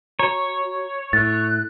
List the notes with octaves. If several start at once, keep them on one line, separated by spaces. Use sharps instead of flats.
F#4 C#5 A#5
A2 F#6 A6